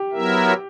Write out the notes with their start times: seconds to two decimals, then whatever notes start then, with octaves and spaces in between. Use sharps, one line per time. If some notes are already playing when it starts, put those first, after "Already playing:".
Already playing: G4
0.11 F#3 B3 E4 A#4 E5